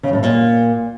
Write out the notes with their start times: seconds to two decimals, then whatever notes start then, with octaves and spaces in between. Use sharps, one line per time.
0.03 C#3
0.13 A2
0.23 A#2